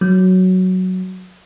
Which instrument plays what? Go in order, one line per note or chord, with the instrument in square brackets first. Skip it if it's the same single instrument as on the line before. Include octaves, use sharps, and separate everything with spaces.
[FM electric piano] F#3